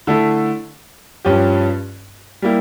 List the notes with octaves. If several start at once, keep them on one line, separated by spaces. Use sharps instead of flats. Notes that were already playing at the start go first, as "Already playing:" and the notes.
D3 A3 E4 A4
G2 F3 C#4 G4
G3 A#3 E4 G4